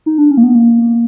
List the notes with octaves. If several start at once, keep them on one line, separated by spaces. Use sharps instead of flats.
D#4
D4
C#4
A#3
B3
A#3